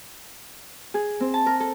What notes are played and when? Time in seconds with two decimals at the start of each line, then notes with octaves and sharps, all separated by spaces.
0.94 G#4
1.20 C4
1.34 A5
1.46 A#4
1.60 A4